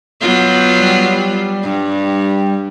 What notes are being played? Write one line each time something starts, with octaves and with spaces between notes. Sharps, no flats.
F#3 B3 F4 G6
G3
G2